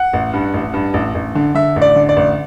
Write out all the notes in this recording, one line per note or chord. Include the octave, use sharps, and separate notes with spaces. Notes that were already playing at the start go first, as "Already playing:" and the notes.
Already playing: F#5
A1
G2
A1
G2
A1
A1
D3
D3 E5
A1
D5
D3
D5
A1